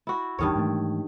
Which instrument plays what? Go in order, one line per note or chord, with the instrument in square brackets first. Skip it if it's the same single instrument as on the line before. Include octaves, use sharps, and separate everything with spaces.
[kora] E4 F#4
[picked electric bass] G#1 E2 [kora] G2 D#3 C#5
[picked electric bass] G#2 E3 A3